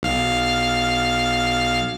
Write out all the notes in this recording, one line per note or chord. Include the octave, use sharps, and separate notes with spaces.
B1 F5 F6